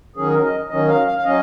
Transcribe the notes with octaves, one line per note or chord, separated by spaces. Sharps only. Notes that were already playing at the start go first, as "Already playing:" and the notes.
D#3 F#3 C#4 G#4
A#4
D#5
D#3 F#3 C#4 D#5
F5
F5
F5
F#3 C#4 D#5